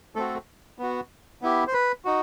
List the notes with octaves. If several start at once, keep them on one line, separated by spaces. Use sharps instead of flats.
A3 C4 F#4 A4
B3 F#4
B3 E4 G4
C5
B4
D#4 F#4